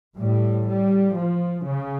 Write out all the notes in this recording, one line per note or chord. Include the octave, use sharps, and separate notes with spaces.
A2 G3
G3
F3
C#3